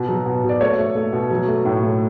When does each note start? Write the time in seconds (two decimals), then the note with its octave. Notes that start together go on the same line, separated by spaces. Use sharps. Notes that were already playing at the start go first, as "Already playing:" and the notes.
Already playing: B2
0.09 F#3
0.26 B2
0.44 B2
0.49 D5
0.61 A3 A4 C#5
0.79 A3
0.95 A3
1.13 B2
1.31 F#3
1.48 A3
1.65 A2
1.83 A3